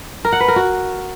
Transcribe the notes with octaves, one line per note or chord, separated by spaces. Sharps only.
A#4
F#5
B4
A#4
F#4